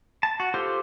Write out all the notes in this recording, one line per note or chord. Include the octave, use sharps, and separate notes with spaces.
A5
F#4
F4 G4 A4 C5